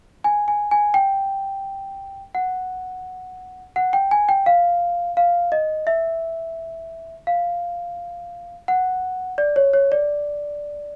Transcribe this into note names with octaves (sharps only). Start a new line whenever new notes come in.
G#5
G#5
G#5
G5
F#5
F#5
G5
G#5
G5
F5
F5
D#5
E5
F5
F#5
D5
C#5
C#5
D5